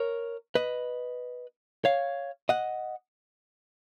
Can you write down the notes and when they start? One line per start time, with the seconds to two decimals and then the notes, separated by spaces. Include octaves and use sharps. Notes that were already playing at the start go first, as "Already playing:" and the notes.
Already playing: A#4 C#5
0.55 B4 D#5
1.85 C#5 F5
2.49 D#5 F#5